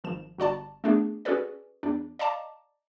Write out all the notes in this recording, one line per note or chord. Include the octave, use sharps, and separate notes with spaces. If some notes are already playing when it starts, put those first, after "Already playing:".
G#1 F3 E7
G1 F#4 D5 A5
A3 B3 D4 G#4
C#4 F#4 G#4 A4 B4 D5
E2 D4
D5 D#5 F5 A5 A#5 D6